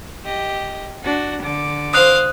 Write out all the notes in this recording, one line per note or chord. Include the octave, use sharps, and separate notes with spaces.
G4 D#5
D4 F#4
D3 D6
C5 F5 D#6 F#6